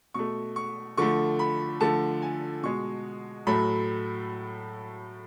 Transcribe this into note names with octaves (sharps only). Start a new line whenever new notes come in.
B2 A3 C#6
C#6
D3 F3 A3 C#6
B5
D3 F3 A3 A5
G#5
B2 G#3 C#6
A2 F#3 A3 B5